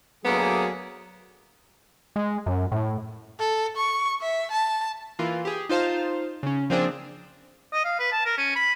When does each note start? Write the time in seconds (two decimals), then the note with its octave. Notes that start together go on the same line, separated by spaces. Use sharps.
0.25 D2 F#3 A#3 B3 G#4
2.16 G#3
2.46 F#2
2.72 A2
3.39 A4
3.77 C#6
4.21 E5
4.52 A5
5.19 E3 A#3 F4
5.45 G4 G#4
5.69 D#4 F4 C5 F5 A5
6.43 C#3 C#4
6.70 F3 A#3 C4 D4 G#4
7.73 D#5
7.85 F5
7.99 B4
8.12 A5
8.25 A#4
8.38 C#4
8.55 B5